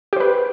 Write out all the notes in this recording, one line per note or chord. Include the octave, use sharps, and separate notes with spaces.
G4 B4 C5